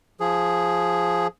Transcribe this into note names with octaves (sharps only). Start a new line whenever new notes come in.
F3 G#4